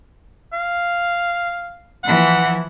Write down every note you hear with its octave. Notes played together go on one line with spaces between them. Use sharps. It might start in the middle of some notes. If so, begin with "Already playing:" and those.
F5
E3 F3 F#5